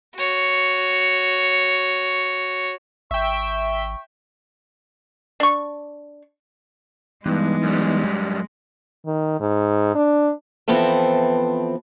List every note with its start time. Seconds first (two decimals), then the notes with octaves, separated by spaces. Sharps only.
0.16 F#4 C#5
3.11 G#1 E5 G5 C#6
5.40 D4 C#6
7.26 G2 E3 G#3 B3 D#4
7.63 F#2 G3
9.06 D#3
9.40 G#2
9.95 D4
10.68 E3 F3 B3 C4 A4 E5